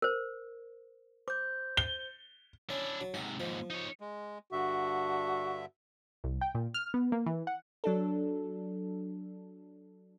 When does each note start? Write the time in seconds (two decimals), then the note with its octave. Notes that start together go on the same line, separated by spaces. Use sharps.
0.02 A#4 C5
1.28 C5 D6 G6
1.77 G7
2.70 C#4 D4 E4
3.01 F#3
3.14 G#2 C3 F#5
3.40 D#2 G#2 F3
3.70 D#4 C#5
4.00 G#3
4.52 G2 D3 F#4 E5
6.24 C2
6.41 G5
6.55 A#2
6.74 F6
6.94 B3
7.12 A#3
7.26 E3
7.47 F#5
7.84 F#3 D4 A4